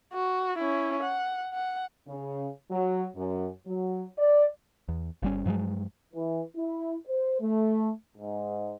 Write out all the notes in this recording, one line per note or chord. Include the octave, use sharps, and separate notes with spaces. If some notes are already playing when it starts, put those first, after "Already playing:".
F#4
C#4 E4
F#5
F#5
C#3
F#3
F#2
F#3
D5
E2
G1 G3 C#4
G2 F3 F#3 G#3
E3
E4
C5
A3
G#2